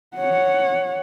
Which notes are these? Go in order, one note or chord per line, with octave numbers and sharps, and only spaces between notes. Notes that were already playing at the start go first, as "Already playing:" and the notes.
C#5 F#5